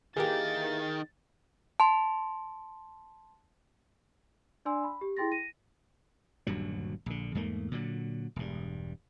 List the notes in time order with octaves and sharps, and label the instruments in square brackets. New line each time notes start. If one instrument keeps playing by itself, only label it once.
[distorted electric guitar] D#3 [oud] E3 A#3 G4 [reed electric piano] G#4 [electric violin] A6
[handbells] A5 C6
[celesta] D4 D5 G#5 C6 E6
B5
G4
E4 G#4 G5 C6 A6 A#6
A#6 D#7
[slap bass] D#1 D2 G2 F#3
A#1 D3
E2 G#2 A3 A#3
A#2 D3 F#3
E1 G2